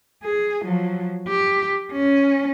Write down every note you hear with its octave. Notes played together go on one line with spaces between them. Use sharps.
G#4
F3 F#3
G4
C#4